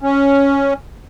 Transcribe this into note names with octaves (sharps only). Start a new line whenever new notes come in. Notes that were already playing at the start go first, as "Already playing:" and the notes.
C#4